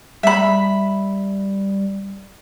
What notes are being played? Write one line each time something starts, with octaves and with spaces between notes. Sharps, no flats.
G3 E5 B5